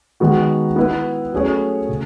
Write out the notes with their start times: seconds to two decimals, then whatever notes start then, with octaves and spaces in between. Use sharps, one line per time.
0.20 D#3 G#3 B3 F#4
0.76 B3 E4 B4
1.33 F#3 A3 C#4 G#4 C#5
1.89 C#3